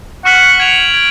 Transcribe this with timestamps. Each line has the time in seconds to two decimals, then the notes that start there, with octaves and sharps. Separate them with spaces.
0.25 F#5 C#6 F6 B6 F#7
0.60 G#6 D7 F7
0.94 G#6 D7 F7